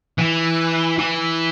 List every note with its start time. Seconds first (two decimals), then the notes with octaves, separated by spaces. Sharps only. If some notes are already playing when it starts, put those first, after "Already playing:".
0.18 E3
0.99 E3